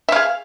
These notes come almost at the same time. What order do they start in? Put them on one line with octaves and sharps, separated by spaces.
E5 F5 G#4